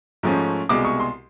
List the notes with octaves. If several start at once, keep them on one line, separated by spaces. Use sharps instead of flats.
G#2 F3 A3 C#4
C2 B2 G#3 D6
C#6
C6